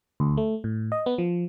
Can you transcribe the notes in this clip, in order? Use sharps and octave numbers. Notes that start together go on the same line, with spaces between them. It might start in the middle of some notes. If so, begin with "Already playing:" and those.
D2
A3
A2
D#5
B3
F3